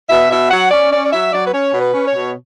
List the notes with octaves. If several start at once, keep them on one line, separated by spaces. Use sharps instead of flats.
B2 E5
B2 E5
F#3 F#5
C#4 D5
C#4 D5
D5
F#3 E5
F#3 D5
B4
C#4 C#5
B2
B4
C#4
C#5
B2